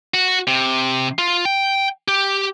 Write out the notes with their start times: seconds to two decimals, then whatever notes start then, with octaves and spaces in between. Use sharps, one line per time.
0.14 F#4
0.47 C3
1.18 F4
1.45 G5
2.08 G4